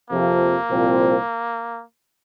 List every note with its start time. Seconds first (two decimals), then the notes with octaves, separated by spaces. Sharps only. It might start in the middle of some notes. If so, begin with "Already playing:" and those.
0.10 F2 C3 F3 A#3
0.69 C2 A#2 F3 C4